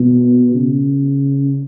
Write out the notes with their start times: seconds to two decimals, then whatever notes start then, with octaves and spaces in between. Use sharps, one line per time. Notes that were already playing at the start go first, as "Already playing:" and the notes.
Already playing: B2
0.55 C#3